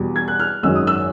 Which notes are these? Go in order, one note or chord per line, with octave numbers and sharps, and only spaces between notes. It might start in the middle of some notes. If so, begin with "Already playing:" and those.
Already playing: E2 B2 G3
G#6
F#6
F6
G#1 F#2 D#3 G#3 E6
D#6
E6